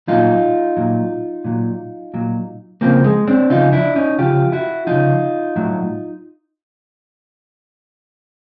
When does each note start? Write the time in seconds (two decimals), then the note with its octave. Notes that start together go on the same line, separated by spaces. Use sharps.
0.08 A#2 F#3 D#4 F4
0.77 A#2 F#3
1.45 A#2 F#3
2.14 A#2 F#3
2.81 C#3 F3 A#3 C4
3.04 G#3
3.27 C4 D4
3.50 C#3 F3 D#4 F4
3.73 D4 E4
3.96 C#4 D#4
4.18 C#3 F3 F4 G4
4.52 E4 F#4
4.87 C#3 F3 D#4 F4
5.56 A2 F#3